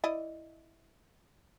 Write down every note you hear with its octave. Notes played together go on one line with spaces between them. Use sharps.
E4 D5 D#5